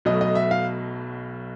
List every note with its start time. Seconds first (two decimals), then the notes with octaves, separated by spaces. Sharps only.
0.05 B1 B2 F#3 A3 D#5
0.21 D#5
0.35 E5
0.51 F5